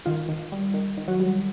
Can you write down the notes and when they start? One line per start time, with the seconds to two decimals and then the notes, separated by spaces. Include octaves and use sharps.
0.06 D#3 F4
0.29 D#3
0.52 G3
0.74 D#3
0.98 D#3
1.08 F#3 F#4
1.20 G3